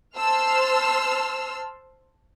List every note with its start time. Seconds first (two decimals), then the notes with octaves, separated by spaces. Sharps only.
0.17 C5 A5 C6 E6 F6